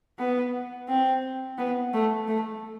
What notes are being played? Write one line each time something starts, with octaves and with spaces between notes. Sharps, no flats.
B3
C4
B3
A3
A3